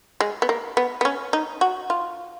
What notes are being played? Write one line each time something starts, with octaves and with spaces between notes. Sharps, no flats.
G#3
B3
A#3
B3
B3
C#4
D#4
F#4
F4